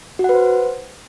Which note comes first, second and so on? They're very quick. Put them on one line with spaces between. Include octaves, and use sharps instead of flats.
F#4 F#5 B4 C5